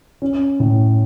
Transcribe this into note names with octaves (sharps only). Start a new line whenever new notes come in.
C#4
A2